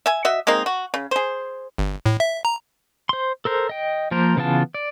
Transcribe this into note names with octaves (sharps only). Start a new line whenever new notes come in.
E5 G#5
F#4 D#5 E5
G#3 A#3 C4 D#4
F#4
C#3
G#4 C5
G1
A2
E5
A#5
C5 C6
A4 A#4 C5
D#5 G5
F3 A#3 A#4 C5
C#3 E3 B3 F4 A5
D5